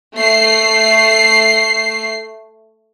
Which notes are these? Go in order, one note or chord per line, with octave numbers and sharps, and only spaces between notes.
A3 C7